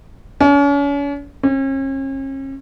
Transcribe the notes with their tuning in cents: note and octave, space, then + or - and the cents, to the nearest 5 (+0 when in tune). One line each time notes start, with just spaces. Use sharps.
C#4 +40
C#4 -40